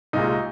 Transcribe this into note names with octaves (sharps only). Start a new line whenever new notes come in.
C2 A#2 G#3 D#4